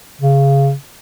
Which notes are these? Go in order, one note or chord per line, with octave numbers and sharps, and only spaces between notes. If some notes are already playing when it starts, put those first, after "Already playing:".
C#3